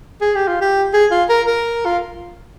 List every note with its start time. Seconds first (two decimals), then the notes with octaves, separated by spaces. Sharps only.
0.21 G#4
0.35 G4
0.48 F4
0.61 G4
0.94 G#4
1.11 F4
1.29 A#4
1.47 A#4
1.86 F4